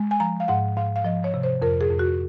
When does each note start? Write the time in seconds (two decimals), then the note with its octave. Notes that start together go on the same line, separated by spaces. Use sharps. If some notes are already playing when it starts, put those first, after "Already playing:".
Already playing: G#3
0.11 G#5
0.20 F3 A#5
0.40 F5
0.48 G#2 F#5
0.77 G#2 F5
0.96 F5
1.05 F3 D#5
1.24 C#5
1.34 C3
1.43 C5
1.62 F2 A#4
1.81 G#4
1.90 F2
1.99 F#4